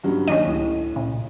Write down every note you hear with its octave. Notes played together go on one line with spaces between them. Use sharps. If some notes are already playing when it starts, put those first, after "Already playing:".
G2 C#3 F#3
D#2 C#4 D4 D#5
C#2 A2
A#2 C#3